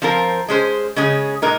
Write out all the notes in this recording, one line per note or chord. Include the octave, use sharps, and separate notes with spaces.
F3 C4 F4 A#4
G#3 C#4 G#4 C5
C#3 G#3 C#4 G#4
A#2 G#3 D#4 A#4